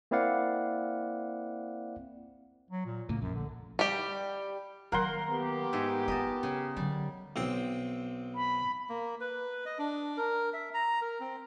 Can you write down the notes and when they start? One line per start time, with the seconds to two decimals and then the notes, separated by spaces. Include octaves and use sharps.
0.11 A#3 C4 E4 D5 F5 F#5
2.71 F#3
2.86 A#2
3.09 A2 C#3 E3 A#3
3.21 A#1 F#2
3.35 D3
3.79 G3 G4
4.92 D#3 F#3 A#3 A#4 F#5 C6
5.30 B3 G4
5.73 G#2 G#3 E5
6.08 E4 F4 D#5 A5
6.43 C#3 G#4
6.77 D3 F#3 G3
7.36 B1 C4 G5
8.35 B5
8.89 A#3
9.21 B4
9.65 D#5
9.79 D4
10.17 A#4
10.53 E5
10.74 A#5
11.02 A#4
11.20 C4